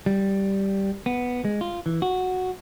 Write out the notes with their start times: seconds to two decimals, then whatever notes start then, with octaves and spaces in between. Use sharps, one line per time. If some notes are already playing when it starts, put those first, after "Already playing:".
0.06 G3
1.06 B3
1.45 G#3
1.61 F4
1.86 E3
2.02 F#4